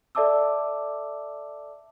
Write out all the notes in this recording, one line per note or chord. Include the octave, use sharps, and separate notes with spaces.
A4 D5 E5 A5 D6 E6